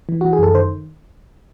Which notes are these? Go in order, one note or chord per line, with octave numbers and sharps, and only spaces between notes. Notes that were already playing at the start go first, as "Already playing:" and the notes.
E3
E3 F#4
G#4
F#2 A4
D#3 C5